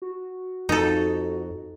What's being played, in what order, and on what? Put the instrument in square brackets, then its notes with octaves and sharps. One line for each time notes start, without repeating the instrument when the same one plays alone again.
[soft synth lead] F#4
[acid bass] F2 [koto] D#4 A4